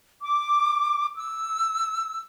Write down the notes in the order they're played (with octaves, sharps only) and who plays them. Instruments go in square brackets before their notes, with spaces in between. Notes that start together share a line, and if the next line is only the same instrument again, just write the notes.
[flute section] D6
E6